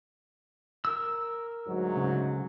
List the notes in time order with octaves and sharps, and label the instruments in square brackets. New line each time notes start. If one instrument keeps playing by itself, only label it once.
[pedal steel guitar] A#4 E6
[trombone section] D2 G#2 F#3
[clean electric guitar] C#3